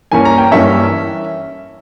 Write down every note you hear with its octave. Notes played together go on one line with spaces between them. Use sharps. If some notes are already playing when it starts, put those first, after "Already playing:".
G2 E3 A#3 C#4 G#5
A#5
G5
G2 E3 A#3 C#4 E5